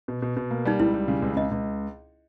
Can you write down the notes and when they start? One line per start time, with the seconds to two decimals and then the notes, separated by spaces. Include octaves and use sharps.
0.08 B2
0.22 B2
0.37 B2
0.51 A#3
0.65 G3 D#4
0.79 C#2 E4
0.94 G3
1.08 C#3
1.22 C#2
1.36 C#2 D#5
1.51 C#2